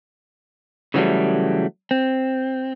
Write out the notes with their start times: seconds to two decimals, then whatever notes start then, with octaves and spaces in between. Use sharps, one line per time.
0.94 C#3 E3 F#3 G3 A3
1.91 C4